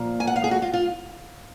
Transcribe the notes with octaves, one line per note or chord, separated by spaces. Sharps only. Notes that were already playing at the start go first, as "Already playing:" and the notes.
Already playing: A#2 F3 A#3
G#5
F#5
F5
G#4
F#4
F4
F4